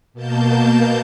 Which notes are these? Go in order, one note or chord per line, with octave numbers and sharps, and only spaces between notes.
B2 A#3 A5 G6